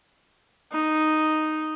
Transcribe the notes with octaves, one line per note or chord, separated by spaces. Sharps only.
D#4